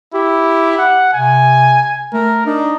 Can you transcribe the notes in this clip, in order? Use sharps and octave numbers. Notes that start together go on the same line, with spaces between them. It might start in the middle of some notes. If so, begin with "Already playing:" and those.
E4 G4
F#5
C3 G#5
A3 A#4
D4 D#4